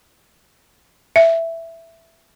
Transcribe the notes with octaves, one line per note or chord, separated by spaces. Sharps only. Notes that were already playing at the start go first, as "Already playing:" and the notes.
E5